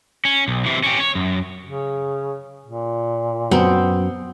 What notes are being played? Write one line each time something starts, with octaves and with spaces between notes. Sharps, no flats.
C#4
B1
C3 E3
C#4 G4
C#5
F#2
C#3
A#2
F#2 B3 C4